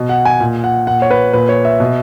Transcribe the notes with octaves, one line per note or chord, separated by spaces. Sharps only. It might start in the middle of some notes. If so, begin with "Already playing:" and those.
Already playing: B2
F#5
G#5
A#2
F#5
A#2 F#5
C#5
B4
A#2 B4
C#5
E5
B2